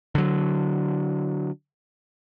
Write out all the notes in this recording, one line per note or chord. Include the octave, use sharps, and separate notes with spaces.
D3 F#3